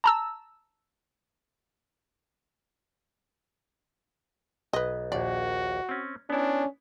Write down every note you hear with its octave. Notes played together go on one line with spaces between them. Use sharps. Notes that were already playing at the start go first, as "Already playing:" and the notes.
A5 A#5 E6
B1 B4 D#5
A#1 D#2 F#4 D5
C4 C#4
B3 C#4 D4 E4